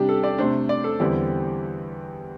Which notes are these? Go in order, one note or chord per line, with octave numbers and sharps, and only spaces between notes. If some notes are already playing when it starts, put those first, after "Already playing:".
Already playing: C3 G3 D4 G4
A4
D5
C3 A3 D4 C5
D5
A4
E2 D3 G3 C4 E4 G4